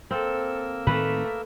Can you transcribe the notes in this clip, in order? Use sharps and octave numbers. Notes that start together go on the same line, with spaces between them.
A#3 C4 A4 A#4 E6
A2 D#3 A3 C4 B4